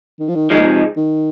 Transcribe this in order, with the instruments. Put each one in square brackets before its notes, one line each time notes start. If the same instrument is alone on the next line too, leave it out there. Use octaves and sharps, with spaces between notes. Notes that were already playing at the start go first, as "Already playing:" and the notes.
[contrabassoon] D#3
F3
D#3
[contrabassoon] D#3 [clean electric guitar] F3 G#3 D#4
[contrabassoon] A#2
C3
D#3